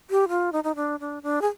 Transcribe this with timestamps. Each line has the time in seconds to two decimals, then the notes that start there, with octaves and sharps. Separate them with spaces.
0.11 G4
0.29 F4
0.52 D#4
0.64 D#4
0.76 D4
1.00 D4
1.23 D4
1.42 G#4